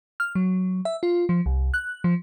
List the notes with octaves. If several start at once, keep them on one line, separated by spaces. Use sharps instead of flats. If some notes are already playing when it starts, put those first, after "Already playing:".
F6
F#3
E5
F4
F3
C2
F#6
F3